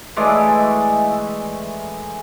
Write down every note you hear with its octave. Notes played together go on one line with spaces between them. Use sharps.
E3 G#3 A3 D5